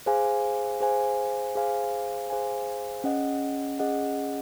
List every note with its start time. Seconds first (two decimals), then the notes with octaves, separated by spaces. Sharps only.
0.06 G#4 C5 F5 G#5
0.80 G#4 C5 F5 G#5
1.55 G#4 C5 F5 G#5
2.30 G#4 C5 F5 G#5
3.04 C#4 G#4 D#5 F#5
3.79 C#4 G#4 D#5 F#5